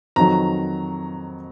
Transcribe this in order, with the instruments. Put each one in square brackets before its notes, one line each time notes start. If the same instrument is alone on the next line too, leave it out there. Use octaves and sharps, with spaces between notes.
[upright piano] F2 D#3 F#3 A#5